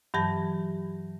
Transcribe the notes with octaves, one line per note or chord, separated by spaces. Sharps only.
G2 E3 F#3 G4 A5 A#6